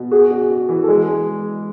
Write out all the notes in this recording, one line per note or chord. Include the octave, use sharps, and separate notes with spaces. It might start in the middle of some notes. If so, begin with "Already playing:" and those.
Already playing: B2
F#4 G#4
F#4
F#4
E3
A4
G#3 G#4
G#3